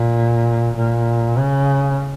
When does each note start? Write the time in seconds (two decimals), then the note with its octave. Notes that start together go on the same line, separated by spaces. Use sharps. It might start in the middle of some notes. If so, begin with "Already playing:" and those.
Already playing: A#2
0.76 A#2
1.38 C#3